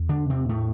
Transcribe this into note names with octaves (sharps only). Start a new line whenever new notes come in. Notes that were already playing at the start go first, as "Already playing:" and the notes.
Already playing: E2
D3 D4
C3 C4
A2 A3